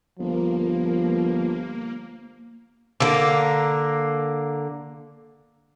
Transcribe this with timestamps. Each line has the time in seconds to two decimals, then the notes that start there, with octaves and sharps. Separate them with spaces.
0.19 G1 F3 A#3
3.00 D3 A#3